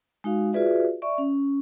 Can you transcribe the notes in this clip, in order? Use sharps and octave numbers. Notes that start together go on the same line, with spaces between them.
G#3 D#4 F#4 F5
F4 F#4 G#4 B4 D5 E5
D5 E5 C#6
C#4